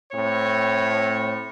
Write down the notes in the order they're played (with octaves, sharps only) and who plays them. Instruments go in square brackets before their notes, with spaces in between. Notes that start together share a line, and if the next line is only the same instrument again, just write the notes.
[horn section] A2 C4 C#5